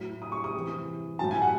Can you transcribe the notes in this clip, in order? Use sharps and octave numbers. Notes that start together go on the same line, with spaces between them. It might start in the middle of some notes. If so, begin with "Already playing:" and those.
Already playing: A2 F#3
D#6
C#6
D#6
C3 E3
A2 F#3 A5
G#5
F#5